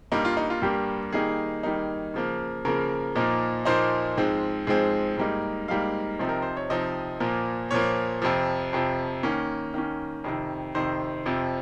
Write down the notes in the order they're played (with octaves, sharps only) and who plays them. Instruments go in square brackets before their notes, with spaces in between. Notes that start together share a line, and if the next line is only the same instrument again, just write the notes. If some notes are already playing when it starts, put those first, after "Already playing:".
[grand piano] G2 G3 A#3 D#4
F4
D#4
F4
G2 G3 A#3 G4
D#3 G3 A#3 D#4 G#4
D#3 G3 A#3 D#4
C#3 F3 A#3
C#3 F3 A#3 A#4
A#2 F3 A#3 D#4
A#2 F3 A#3 D#4 C5
G#2 F3 G#3 C4
G#2 F3 G#3 C4 G#4
G#2 G3 A#3 D#4
G#2 G3 A#3 D#4 F5
C3 F3 C4 D#4
A#4
C5
C#5
C3 F3 C4 D#4 D#5
A#2 F3 A#3
A#2 F3 A#3 C#5
F2 C3 F3
F2 C3 F3
D#3 A#3 C#4
D#3 A#3 C#4
F2 C3 D#3
F2 C3 D#3 C5
F2 C3 F3